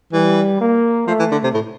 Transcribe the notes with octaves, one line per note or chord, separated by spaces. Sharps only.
E3 G3
A#3
F3 A3
E3
D3
C3
A2